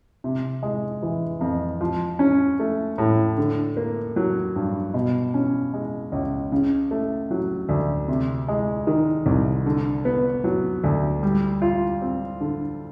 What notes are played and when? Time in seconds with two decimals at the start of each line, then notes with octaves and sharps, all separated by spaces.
0.24 C3
0.63 G#3
1.03 E3
1.41 F2
1.81 F3
2.19 C#4
2.60 A3
2.98 A2
3.38 D3
3.77 A#3
4.16 F#3
4.56 G2
4.94 B2
5.34 C#4
5.73 G#3
6.12 C#2
6.52 C#3
6.91 A3
7.31 F#3
7.69 D2
8.08 C3
8.48 G#3
8.87 D#3
9.26 C2
9.66 D3
10.05 B3
10.44 F#3
10.84 D2
11.23 G3
11.62 F4
12.02 C4
12.41 D3